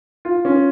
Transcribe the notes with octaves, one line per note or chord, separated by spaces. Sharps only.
F4
C#4